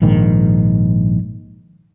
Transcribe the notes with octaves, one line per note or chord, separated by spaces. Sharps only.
A#1 G#2 D#3